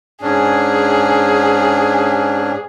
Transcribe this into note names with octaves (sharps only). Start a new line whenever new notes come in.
G#2 C#4 D4 G#4